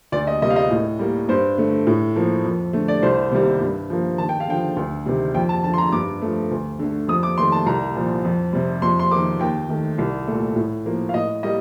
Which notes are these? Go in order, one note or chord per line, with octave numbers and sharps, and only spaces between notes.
D2 D5
D#5
C3 G3 A#3 D#5
F5
D#5
A2
G3 A#3
G2 C5
D3 A3
A2
F3 A#3
F2
D3 A3
D5
C2 C5
C3 D#3 G3 A#3
G2
F3 A#3
D#2 A5
G5
F5
D3 F3 G5
D2
C3 D#3 G3
F2 G5
A5
D3 F3 A5
C6
A#5
G2 D6
F3 A3
D2
D3 A3
F2 D#6
D6
D#3 A3 C6
A5
C2 A#5
A#2 F3
F2
C3 G3
F2 C6
C6
D#3 A#3 D6
D#2 G5
D#3 A3
C2
A#2 A3
A2
F3 A#3
F5
A2 D#5
G3 A#3 D#5